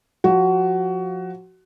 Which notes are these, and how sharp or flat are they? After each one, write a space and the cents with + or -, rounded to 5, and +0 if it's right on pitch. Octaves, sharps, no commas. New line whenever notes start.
F3 +30 F#4 +20 F5 +20